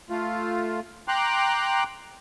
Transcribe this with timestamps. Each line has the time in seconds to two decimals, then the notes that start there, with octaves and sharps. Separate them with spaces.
0.10 A3 F4
1.08 G5 A#5 C6 D6 F#6